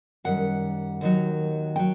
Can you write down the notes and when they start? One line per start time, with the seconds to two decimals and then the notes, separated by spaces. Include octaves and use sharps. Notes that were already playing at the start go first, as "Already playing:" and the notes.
0.24 F#2 D#3 G3 F#5
1.01 D#2 D#3 F#3
1.76 F#3 G5